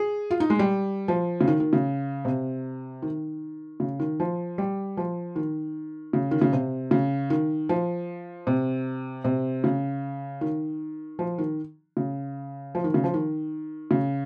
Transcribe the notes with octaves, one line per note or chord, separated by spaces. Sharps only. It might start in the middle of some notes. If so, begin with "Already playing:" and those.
Already playing: G#4
F4
D#4
G#3
G3
F3
C#3
D#3
D#3
C#3
C3
D#3
C#3
D#3
F3
G3
F3
D#3
C#3
D#3
C#3
C3
C#3
D#3
F3
C3
C3
C#3
D#3
F3
D#3
C#3
F3
D#3
C#3
F3
D#3
C#3